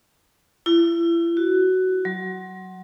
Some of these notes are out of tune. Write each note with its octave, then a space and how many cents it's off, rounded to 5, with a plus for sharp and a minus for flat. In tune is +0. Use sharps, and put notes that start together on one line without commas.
E4 +35
F#4 +15
F#3 +15